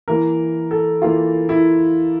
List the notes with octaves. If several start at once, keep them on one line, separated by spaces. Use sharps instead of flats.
E3 A#3 E4 A#4
A4
E3 A#3 E4 F4
E4